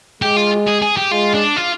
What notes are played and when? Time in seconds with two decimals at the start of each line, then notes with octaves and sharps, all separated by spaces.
0.22 G#3 G4
0.37 F4
0.67 G#4
0.82 G#4
0.97 G4
1.11 G#3 F4
1.34 D4
1.57 F4